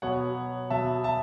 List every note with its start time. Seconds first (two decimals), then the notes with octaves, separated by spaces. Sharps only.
0.02 B2 F#3 B3 C#5 F#5
0.70 B2 F#3 B3 E5 A5
1.04 E5 A5